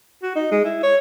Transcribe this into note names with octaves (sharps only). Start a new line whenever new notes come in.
F#4
D#4
G#3
E4
C#5